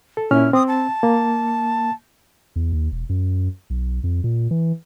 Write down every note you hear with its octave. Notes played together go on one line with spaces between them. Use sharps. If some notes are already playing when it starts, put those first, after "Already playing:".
A4
A#2 C#4 E4 F6
C4 D#6
A5
A#3
E2
D#2
E1
F#2
B1
F2
A#2
E3